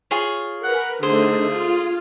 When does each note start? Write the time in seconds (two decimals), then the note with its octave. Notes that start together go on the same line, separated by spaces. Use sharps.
0.11 F4 G#4 C#5
0.64 A#4 B4 F#5
1.03 D3 A3 D#4 G#4 C5
1.48 F4